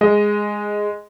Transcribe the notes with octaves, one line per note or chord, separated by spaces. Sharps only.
G#3 D#5